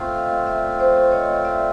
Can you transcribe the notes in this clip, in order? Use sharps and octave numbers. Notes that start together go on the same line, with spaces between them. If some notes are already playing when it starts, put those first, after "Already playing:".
Already playing: A3 C4 F4
D#5 F5
D5 E5
C5 D5
C#5 D#5
D5 E5